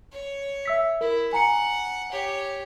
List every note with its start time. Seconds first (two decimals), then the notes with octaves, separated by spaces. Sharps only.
0.12 C#5
0.65 E5 E6 B6
1.01 E4 A#4
1.33 F#5 G#5 A#5 C#7
2.12 G4 C#5